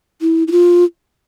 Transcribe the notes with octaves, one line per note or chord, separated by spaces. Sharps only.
E4
E4
F4